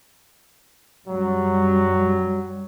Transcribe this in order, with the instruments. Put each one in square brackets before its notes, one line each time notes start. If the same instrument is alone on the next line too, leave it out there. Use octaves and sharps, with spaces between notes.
[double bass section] F#2 G3 [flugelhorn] F#3